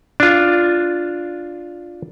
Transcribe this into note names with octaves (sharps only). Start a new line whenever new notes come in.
D4 F4